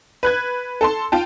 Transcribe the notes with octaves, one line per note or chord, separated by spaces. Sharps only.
B4 F#6 G#6
A4 A5 C6
F4 G5 A5